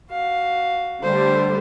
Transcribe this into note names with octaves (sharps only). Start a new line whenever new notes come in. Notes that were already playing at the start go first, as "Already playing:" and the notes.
F#4 F5
D3 G3 A3 C5